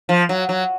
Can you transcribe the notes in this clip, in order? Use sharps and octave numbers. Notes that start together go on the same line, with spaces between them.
F3
F#3
F#3